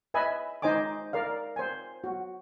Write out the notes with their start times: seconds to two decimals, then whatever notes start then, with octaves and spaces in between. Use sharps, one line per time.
0.14 B4 D#5 E5 G#5 B5
0.62 D#4 C5 D#5 G#5 D6
1.13 A#4 D5 F5
1.56 C5 G#5
2.04 F#4